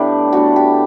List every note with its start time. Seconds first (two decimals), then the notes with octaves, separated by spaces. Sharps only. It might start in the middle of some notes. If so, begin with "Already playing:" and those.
Already playing: A2 G3 A3 B3 D4
0.33 A2 G3 B3 D4 F#4
0.56 G4